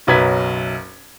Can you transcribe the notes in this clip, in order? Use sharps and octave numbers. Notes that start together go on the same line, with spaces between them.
F#1 B1 F#3 B4 G#6 B6